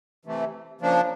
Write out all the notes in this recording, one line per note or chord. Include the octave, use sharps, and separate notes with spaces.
C3 E3 A3
C#3 F3 A#3 D4